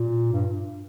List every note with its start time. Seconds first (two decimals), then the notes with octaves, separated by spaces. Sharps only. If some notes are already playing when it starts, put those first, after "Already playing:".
Already playing: A#2
0.33 G2